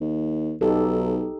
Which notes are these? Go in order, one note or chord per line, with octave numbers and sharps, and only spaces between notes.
D#2
B1 D#4 G4 A4